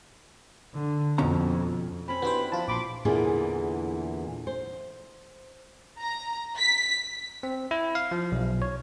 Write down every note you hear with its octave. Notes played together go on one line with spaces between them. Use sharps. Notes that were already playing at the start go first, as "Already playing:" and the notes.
D3
F2 B2 C#4 A#5
C4 C#4 B5
B3 D4 E4 F#4 G4 C5
F3 F4 A5
A#1 B5 C6 D6
E2 A#2 D3 E3 G#4
C5
A#5
B6
C4
E4
F5
F3
B1
C#5